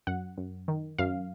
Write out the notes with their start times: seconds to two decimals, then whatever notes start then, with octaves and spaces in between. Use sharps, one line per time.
0.07 F#2 F#5
0.38 F#2
0.68 D#3
0.99 F#2 F5